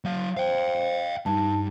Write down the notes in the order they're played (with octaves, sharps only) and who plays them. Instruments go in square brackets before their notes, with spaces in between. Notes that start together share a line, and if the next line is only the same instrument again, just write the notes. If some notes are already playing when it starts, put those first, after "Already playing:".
[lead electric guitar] F#3 F5
[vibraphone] C5 [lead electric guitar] F5 G5
[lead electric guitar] G2 [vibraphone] D#4 A5